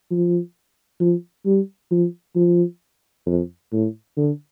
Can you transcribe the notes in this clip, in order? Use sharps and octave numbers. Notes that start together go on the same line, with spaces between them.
F3
F3
G3
F3
F3
F2
A2
D3